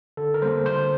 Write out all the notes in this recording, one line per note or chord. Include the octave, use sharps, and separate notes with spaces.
D3 A4
A#4
G3 A#3 C5
D3 C5